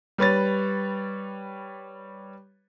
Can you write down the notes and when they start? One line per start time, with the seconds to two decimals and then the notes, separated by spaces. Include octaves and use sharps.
0.18 G3 B4 C#5 A6